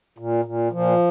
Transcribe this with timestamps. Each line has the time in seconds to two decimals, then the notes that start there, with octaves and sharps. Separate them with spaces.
0.18 A#2
0.45 A#2
0.72 A#2 F3